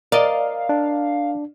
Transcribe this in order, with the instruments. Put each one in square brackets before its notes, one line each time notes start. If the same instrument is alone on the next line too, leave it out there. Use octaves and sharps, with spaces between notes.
[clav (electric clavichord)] A#4 D#5 [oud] D5 [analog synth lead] F5
[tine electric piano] D4